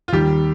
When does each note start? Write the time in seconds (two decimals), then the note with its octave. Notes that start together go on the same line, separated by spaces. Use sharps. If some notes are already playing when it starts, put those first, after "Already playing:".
0.08 F4
0.13 D#2 D#3 G3 G4